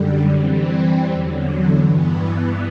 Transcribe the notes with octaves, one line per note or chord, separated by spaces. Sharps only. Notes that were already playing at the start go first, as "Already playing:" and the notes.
Already playing: F#2 D3 G3
E3 G3 C4
E2 D3 F#3
G2 E3 B3